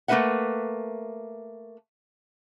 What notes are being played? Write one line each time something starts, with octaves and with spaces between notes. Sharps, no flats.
A3 A#3 D#4 B4 E5 F#5